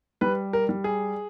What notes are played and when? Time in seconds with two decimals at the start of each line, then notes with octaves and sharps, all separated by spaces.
0.21 G3 B4
0.53 A#4
0.69 G3
0.84 G#4